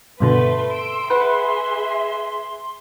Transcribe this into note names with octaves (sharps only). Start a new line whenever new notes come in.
G2 B2 D3 A3 B4 C6
E6 D7
G#4 B4 E5 F#5